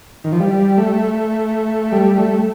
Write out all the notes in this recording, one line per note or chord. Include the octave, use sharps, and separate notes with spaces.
D#3
F3
G3
A3
G3
A3